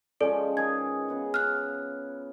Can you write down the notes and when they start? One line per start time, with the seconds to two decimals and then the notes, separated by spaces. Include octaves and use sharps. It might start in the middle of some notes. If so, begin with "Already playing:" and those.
0.21 F3 G#3 C#4 A4 D5
0.57 D#3 G#4 B4 G#6
1.08 C#3 B3 F4
1.34 F6 F#6